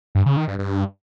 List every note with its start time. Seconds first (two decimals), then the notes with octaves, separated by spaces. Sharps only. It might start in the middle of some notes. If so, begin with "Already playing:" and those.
0.15 G2
0.26 C#3
0.37 D#3
0.48 G2
0.59 G2